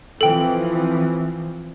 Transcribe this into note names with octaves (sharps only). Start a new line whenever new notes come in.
E3 F3 C4 A4 G5